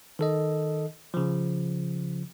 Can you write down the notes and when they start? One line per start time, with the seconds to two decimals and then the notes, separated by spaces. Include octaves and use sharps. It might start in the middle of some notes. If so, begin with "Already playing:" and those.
0.19 D#3 A4 D#5
1.14 C#3 F3